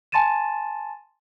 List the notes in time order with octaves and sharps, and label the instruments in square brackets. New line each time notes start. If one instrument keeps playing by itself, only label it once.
[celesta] G#5 A5 C6 A6 D#7 E7